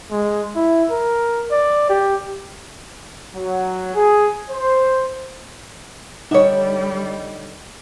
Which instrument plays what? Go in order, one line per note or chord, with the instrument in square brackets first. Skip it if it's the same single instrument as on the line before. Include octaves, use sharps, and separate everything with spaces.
[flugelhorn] G#3
E4
A#4
D5
G4
[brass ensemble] F#3
G#4
C5
[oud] D3 C#5 [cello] G3 [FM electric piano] D#4 D#5